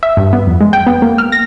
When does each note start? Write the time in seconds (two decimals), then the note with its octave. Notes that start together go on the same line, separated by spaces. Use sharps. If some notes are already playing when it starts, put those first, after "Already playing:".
0.03 E5
0.17 G2
0.33 B3
0.47 F2
0.61 G#3
0.73 G5
0.87 B3
1.02 A#3
1.18 F6
1.32 A#6